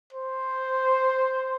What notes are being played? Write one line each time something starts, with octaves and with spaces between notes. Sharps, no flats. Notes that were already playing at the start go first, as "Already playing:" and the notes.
C5